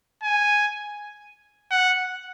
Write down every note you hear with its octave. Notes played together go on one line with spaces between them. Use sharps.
G#5
F#5